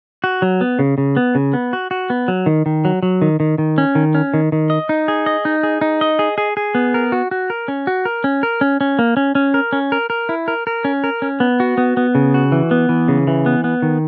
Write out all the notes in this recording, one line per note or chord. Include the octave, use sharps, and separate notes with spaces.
F#4
F#3
B3
C#3
C#3
B3
C#3
B3
F#4
F#4
B3
F#3
D#3
D#3
F#3
F#3
D#3
D#3
D#3
C#4
D#3
C#4
D#3
D#3
D#5
D#4
G#4
D#5
D#4
G#4
D#4
D#5
G#4
G#4
G#4
B3
A#4
F#4
F#4
A#4
C#4
F#4
A#4
C#4
A#4
C#4
C#4
A#3
C#4
C#4
A#4
C#4
A#4
A#4
E4
A#4
A#4
C#4
A#4
C#4
B3
F#4
B3
B3
C#3
F#4
E3
B3
E3
C#3
E3
B3
B3
D#3